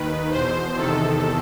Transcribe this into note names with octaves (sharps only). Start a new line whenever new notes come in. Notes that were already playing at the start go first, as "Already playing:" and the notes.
Already playing: D#2 D#3 B4
E2 B2 C5
E2 C3 D#3 A4